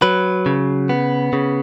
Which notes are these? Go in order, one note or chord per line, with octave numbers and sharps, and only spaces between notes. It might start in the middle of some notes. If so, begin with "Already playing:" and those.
F#3 B4
C#3
B3
C#3